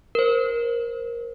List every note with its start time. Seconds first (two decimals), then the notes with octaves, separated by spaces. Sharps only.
0.15 A#4 C5